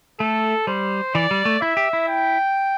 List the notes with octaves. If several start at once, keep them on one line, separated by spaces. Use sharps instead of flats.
A3 A4
G3 C5
E3 D5
G3
A3
E4 E5
G4
E4
G5